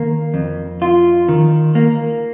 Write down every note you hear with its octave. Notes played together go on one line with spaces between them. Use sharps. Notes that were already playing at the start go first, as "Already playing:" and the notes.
Already playing: D#3 A#3
F2
F4
D#3
A#3